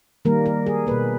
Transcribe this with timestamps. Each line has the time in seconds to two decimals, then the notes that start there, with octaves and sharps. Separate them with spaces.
0.25 D#3 G3 A#3 A#4
0.46 A#4
0.66 G#4
0.87 B2 A#3 B4